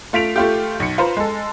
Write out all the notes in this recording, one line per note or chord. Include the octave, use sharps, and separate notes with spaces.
A3 F4 B6 D7 F7
A3 F4 G4
B1 C#7
F4 B4 C5 A#5
G#3 A4